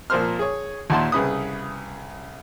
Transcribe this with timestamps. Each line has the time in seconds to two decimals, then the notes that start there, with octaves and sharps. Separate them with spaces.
0.10 A#2 F3 A#4 C5 C6 F6
0.39 G#4 C#5
0.90 D#2 A#2 E5 F#5 A5 C6
1.12 C2 C#3 B4 D#6